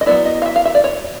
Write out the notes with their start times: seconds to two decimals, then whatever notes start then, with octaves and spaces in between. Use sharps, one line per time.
0.01 D#5
0.06 F#3 B3 E4 D5
0.25 D#5
0.42 F5
0.46 E5
0.56 F5
0.65 E5
0.75 D5
0.84 C#5